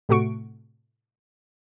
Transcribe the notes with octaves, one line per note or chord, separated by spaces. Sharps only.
A2 C3 A3 F#4 C#6 D7